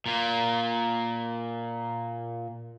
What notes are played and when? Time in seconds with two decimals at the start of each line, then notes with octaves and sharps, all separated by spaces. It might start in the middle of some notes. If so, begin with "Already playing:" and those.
0.06 A#2 A#3